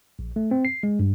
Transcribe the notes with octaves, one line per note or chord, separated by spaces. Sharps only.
A#1
A3
C4
C7
G#3
G2